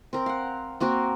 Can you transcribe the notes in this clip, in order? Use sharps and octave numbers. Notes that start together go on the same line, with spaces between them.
C4 A#4
F5 F#5
A#3 C4 F#4 A#4